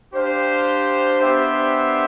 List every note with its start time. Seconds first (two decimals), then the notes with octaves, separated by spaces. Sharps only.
0.13 D4 G4 C5 F5
1.21 B3 D4 G4 C5 E5